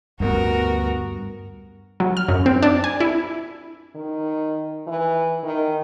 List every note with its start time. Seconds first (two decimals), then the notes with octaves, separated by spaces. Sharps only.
0.20 D2 G2 G3 B3 F#4 A#4
2.00 F#3
2.17 F6
2.28 F#2
2.46 C4
2.62 D4
2.84 G#5
3.00 E4
3.96 D#3
4.87 E3
5.43 D#3